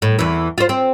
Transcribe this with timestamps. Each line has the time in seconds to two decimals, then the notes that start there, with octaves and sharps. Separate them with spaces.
0.02 A2
0.19 E2 E3
0.58 F4 C5
0.69 C4